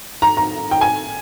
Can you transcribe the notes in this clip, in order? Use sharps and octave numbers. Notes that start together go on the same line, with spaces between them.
A#5
A#5
G5
G#5